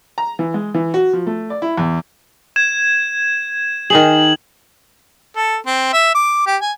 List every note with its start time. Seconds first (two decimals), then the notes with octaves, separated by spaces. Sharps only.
0.18 A#5
0.39 E3
0.54 G#3
0.74 E3
0.94 F#4
1.13 F3
1.27 A3
1.50 D5
1.62 E4
1.78 E2
2.56 G#6 E7
3.90 D#3 D#4 G#4 F#7
5.37 A4
5.66 C4
5.93 E5
6.15 D6
6.47 G4
6.61 G#5